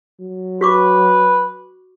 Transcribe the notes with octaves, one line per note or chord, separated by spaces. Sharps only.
F#3
F#4 B4 C#6 D6